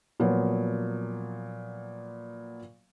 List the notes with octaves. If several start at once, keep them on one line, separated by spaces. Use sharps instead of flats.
A#2 F3 F#3 A#3 B3